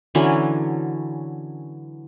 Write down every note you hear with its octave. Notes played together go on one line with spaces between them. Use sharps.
D3 E3 F#3 C#4